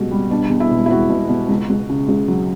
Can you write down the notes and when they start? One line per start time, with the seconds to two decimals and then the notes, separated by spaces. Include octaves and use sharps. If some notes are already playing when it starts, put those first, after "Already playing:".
Already playing: C#2 B2 G3 F#4 G4
0.11 G3
0.30 B2 D4
0.50 E2
0.60 E4
0.71 E1
0.86 E4
0.89 E1 F#4
1.09 B2
1.29 B2
1.49 C#2
1.70 C#2
1.90 C#3
2.08 C#2
2.28 F#3